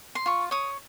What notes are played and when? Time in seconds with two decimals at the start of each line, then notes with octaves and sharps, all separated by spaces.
0.15 C6
0.26 F4 C#6
0.51 C#5 D#6